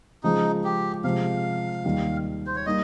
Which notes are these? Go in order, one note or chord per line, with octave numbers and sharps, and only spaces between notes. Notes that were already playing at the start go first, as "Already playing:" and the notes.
C#3 F3 G#3 D#4
G4
C3 F3 G#3 F5
D#2 D#3 G3
C5
C#5
G3 A#3 D#4 D#5